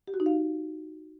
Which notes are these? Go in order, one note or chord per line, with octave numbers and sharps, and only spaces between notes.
G4
F#4
D#4
F5